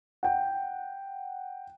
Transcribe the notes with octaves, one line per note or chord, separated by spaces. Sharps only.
F#5 G5